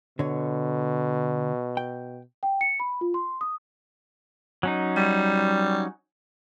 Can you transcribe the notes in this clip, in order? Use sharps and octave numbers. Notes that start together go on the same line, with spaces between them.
B2 D3 C#5
G5
G5
C#7
B5
F4
C6
D#6
F#3 C#4 D#4
G3